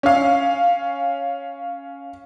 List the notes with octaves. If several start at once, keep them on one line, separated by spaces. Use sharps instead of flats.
C#4 F5